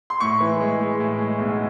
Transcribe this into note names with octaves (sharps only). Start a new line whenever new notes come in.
C6
A2 C#6
E3
G#3
G#3
A2
G#3
B1